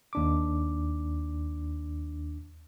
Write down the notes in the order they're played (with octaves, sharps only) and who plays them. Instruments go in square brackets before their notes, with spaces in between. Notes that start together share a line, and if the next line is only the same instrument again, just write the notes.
[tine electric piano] D#2 D4 D6